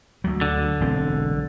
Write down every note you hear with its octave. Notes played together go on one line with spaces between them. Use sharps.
D2 F#3
D3
E1 B1 C4